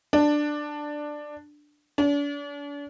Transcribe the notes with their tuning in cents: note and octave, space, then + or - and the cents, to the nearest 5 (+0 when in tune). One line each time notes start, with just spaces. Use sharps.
D4 +10
D4 -40